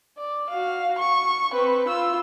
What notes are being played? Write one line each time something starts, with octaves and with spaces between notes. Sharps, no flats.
D5
F#4 F5
C#6
C4 B4
F4 E6